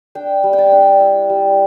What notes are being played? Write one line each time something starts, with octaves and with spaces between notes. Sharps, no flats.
D4 G5
G3
G5
A5
D4
E4
G3